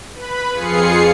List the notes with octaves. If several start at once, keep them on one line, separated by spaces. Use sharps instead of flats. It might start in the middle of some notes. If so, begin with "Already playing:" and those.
B4 B5
F2 F4 G#4 C7 C#7